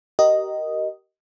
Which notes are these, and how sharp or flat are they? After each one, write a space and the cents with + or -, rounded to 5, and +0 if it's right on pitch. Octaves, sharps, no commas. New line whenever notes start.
G4 -35 A#4 +0 D#5 +0